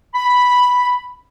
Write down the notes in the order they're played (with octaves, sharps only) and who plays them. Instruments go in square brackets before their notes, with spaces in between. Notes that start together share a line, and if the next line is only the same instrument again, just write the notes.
[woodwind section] B5